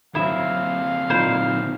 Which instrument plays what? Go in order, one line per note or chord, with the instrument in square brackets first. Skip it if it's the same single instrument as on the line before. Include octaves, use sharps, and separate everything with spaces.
[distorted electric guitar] D3 C4 [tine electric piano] F#3 [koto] E4 E5 [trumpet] F5
[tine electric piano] A#2 F#3 D#4 [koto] E4 C5